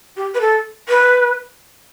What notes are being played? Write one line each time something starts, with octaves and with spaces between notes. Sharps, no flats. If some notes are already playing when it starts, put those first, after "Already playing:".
G4
B4
A4
B4